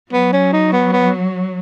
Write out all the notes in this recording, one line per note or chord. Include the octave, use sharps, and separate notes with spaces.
F#3 B3
C#4
D#4
B3
B3